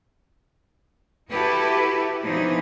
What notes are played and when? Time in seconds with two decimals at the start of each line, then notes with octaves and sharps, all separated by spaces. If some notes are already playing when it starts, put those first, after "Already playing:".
1.31 E4 F#4 G4 A4 B4
2.23 B2 E3 F3 D4 D#4